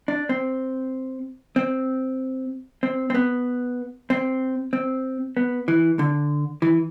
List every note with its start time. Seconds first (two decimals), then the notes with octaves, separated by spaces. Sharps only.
0.08 D4
0.29 C4
1.56 C4
2.83 C4
3.10 C4
3.14 B3
4.10 C4
4.73 C4
5.37 B3
5.68 E3
5.99 D3
6.62 E3